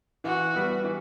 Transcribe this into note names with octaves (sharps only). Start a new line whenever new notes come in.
E3 F#4
G3 B3
E3